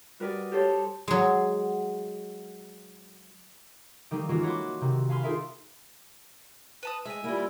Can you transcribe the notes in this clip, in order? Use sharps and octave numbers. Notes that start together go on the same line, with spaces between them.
G3 F#4 A#4 B4 D5 D#5
G4 A4 C5 C#5
F#3 G#3
D#3 G3 A#3 C4 D#4
E3 G#3 A#3 C#4 F4 F#4
F#4 C#5 B5 C6 D6
C3 D#3
F5 G#5 B5 C6 F6
D#4 F4 G#4 A#4 E5
B4 A5 D#6
G#3 E5 G#5
G3 A#3 E4 F4